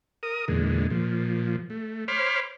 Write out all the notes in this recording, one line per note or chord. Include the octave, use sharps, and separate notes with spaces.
A#4 D#6
E2 A#2 D3 G#3
A#2 F3
A3
C5 C#5 B5 C6 D6 F6